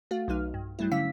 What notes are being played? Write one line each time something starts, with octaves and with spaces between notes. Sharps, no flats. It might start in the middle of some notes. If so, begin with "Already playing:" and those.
A3 F#4 F5
B1 F#3 D#4 F6
G2
G2 F#3 G3 A3 E4
D3 C#4 F5 E6 B6